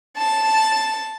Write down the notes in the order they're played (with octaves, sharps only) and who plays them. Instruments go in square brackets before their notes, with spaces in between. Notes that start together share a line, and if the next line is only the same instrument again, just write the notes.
[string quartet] A5